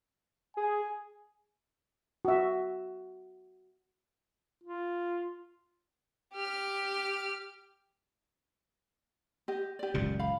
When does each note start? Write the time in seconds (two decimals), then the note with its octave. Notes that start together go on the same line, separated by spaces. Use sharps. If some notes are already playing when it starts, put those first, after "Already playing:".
0.57 G#4 G#5
2.25 F#4 E5
4.63 F4
6.33 G4 F6
9.48 G4 D#5
9.79 G4 D5
9.94 F#1 C#2 A#2
10.19 F5 B5